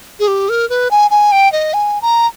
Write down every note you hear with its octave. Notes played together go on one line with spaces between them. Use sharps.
G#4
G4
A#4
B4
G#5
G#5
G5
D#5
G#5
A#5